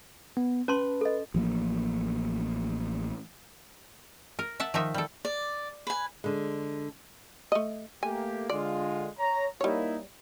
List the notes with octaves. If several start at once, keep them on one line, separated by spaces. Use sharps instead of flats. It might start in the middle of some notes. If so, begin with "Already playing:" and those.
B3
C#4 B4 A5 C6
A4 D#5
A1 F3 F#3 A#3
A#4
E5 F#5 A5
D#3 F3 D#4 E5
G3 A4
D5
B4 G#5
D3 G#3
A3 D#5
A3 A#3 G4 G#5
D3 G#3 F4 D5
C#5 A#5
G3 A#3 D#4 E4 C#5